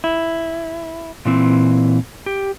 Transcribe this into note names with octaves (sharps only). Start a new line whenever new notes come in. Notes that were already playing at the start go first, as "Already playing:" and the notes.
E4
A#2 E3 C4
G4